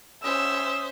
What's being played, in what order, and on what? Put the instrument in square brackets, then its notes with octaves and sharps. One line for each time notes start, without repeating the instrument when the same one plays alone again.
[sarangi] C#4 [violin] C5 E5 [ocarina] D#6 [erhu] E6